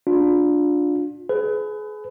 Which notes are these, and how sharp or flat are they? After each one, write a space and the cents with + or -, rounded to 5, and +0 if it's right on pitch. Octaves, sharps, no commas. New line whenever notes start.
D4 +0 F4 +30
G#4 +35 B4 +25